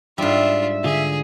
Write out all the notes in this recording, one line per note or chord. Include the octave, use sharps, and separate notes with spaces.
G#2 G3 D4 F4 E5
D3 F4 G#4